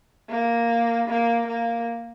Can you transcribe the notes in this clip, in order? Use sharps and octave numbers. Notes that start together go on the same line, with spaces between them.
A#3
A#3
A#3